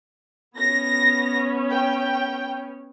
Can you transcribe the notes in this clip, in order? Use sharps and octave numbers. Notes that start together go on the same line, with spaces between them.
B3 C#4 A#6
G5